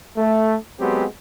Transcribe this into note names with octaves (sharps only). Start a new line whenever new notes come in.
A3
F#3 G#3 B3 C4 F#4 G4